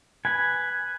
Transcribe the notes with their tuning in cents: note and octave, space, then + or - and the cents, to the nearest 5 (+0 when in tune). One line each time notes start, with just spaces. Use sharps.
B4 +0 G#5 +0